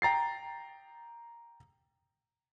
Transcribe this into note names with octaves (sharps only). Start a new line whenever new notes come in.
G5 A#5 A6 C7